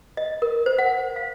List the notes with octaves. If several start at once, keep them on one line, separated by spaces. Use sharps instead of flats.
D#5
A#4
C5
F#5
F5